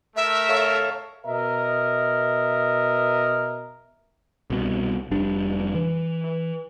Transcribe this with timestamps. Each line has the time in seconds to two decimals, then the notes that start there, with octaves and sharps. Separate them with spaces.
0.16 A3 A#4 E5
0.49 A4 C#5 F5
1.26 B2 A#4 D#5 E5
4.50 C2 B2
5.11 F1 G3 D4
5.75 E3